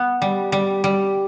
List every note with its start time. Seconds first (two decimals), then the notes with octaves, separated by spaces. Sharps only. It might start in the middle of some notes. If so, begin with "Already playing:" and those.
Already playing: B3
0.22 G3
0.52 G3
0.84 G3